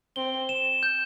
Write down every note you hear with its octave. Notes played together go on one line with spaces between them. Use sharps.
C4 G7
E7
G6